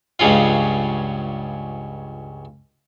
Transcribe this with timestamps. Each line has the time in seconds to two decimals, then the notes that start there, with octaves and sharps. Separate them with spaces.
0.19 C#2 G2 C#3 C#4 F4